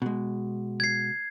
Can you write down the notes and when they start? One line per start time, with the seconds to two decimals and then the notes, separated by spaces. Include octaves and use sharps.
0.02 B2 G#3
0.80 G#6 C7